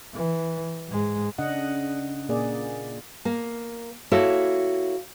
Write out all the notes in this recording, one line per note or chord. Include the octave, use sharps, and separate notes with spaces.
E3
G#2 G#3
C#3 D4 D#5 F#5
A#2 A#3 G#4 D5
A#3
A#3 E4 F#4 A4 C#5